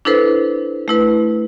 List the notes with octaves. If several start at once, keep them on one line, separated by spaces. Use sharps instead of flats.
D4 E4 A4 B4 C5
A3 E4 B4